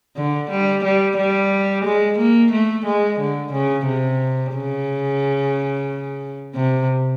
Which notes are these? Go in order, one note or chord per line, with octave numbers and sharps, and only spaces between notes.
D3
G3
G3
G3
G#3
A#3
A3
G#3
D3
C#3
C3
C#3
C3